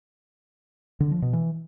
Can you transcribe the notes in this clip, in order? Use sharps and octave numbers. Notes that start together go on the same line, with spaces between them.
D3
F3
B2
E3